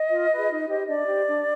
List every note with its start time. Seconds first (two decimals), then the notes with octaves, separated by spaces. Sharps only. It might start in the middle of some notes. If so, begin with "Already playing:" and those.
Already playing: D#5
0.11 F4
0.31 G#4 B4
0.50 D#4
0.68 G4 C5
0.88 D4 D5
1.07 G4 C5
1.27 D4